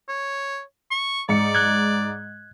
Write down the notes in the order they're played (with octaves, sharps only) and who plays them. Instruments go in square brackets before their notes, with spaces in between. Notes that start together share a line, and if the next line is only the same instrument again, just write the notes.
[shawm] C#5
C#6
[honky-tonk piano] G#2 C#7 [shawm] D5
[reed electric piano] F#6 G#6